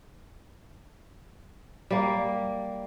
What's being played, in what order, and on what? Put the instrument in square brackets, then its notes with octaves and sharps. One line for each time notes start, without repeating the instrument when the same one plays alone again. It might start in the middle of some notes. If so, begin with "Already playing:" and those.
[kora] G3 A#3